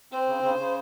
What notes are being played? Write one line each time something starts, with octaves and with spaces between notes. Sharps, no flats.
C4 C5
C#3
C#3
C#3